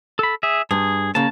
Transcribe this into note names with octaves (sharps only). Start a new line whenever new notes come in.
A4 B5
G#4 E5
G2 G#4
C#3 A#3 A5